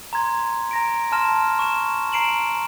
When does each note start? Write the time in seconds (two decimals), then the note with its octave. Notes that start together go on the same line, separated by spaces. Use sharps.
0.13 A#5 C6 G#6
0.71 A#5 A#6 D7
1.12 A5 C6 F6 A#6 E7
1.59 C#6 E7
2.13 A#5 C7 D7 E7 F#7